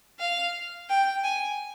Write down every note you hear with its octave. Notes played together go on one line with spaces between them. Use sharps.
F5
G5
G#5